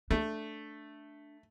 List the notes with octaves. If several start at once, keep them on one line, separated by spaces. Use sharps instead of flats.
A3 D4